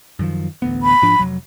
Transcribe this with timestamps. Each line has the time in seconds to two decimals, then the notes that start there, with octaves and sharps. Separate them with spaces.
0.19 F#2 D#3 F3
0.62 A1 D2 B3
0.83 B5
1.02 G#2 F3 D4
1.19 F1 G#2 F#3